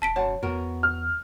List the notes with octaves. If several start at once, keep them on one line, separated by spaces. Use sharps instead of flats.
E1 A5 B6 D7
F#2 C#5 F#5 A5
E2 B3 F#4 A#4
F6